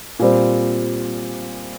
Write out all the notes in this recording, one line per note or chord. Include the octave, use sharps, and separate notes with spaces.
A#2 G3 C4